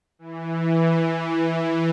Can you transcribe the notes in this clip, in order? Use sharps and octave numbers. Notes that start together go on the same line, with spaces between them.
E3